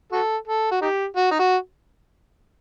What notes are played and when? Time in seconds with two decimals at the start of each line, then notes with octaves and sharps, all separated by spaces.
0.12 F#4 A4
0.48 A4
0.71 F#4
0.81 D#4 G4
1.16 F#4
1.31 D#4
1.39 F#4